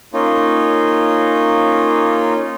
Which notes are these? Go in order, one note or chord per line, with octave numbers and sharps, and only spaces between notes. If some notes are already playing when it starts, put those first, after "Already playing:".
A#3 C#4 D#4 F4